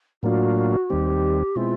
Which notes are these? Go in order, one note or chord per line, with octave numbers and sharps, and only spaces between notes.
A2 F#3 A#3 D4 F4 F#4
D#2 D#3 G3 C4 G4
B2 G#3 C4 E4 F4